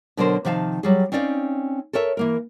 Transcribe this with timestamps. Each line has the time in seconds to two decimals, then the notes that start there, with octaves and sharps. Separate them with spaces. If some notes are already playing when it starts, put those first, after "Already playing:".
0.17 B2 D3 F#3 D4 A#4 C5
0.45 C3 D#3 F3 F5 A5
0.83 F#3 G3 G#4
1.12 C4 C#4 D#4 D5 D#5 F5
1.93 A4 A#4 C#5 E5
2.17 E3 A#3 A#4